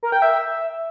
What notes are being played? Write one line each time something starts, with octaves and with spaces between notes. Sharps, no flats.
A#4
G5
E5